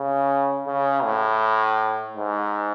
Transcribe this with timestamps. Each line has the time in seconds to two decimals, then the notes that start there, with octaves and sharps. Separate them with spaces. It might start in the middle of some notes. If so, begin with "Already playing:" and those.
Already playing: C#3
0.67 C#3
1.04 A2
2.17 G#2